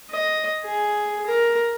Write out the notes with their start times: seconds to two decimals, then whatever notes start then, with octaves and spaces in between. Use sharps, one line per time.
0.11 D#5
0.65 G#4
1.27 A#4